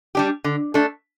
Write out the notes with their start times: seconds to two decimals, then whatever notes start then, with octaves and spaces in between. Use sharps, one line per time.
0.15 G3 D4 G4
0.44 D3
0.74 A3 D4 A4